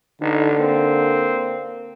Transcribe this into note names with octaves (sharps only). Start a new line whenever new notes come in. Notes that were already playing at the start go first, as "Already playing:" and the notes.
A1 D3 D#4
A#3 C4